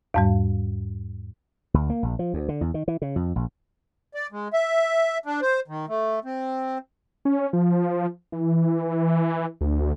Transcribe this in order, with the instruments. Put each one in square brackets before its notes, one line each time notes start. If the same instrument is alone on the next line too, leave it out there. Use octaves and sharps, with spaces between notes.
[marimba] E2 G#2 G3
[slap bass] D2
A#3
A#1
F3
D2
D3
E2
D#3
E3
C#3
F2
A#1
[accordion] D5
G#3
E5
D4
C5
D#3
A3
C4
[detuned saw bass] C#4
F3
E3
D2